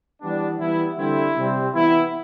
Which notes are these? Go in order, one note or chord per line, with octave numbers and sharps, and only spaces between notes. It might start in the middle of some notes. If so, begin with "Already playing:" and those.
E3 G3 B3 D4
E3 G3 B3 E4
D3 G3 C4 E4
C3 G3 C4
E3 B3 E4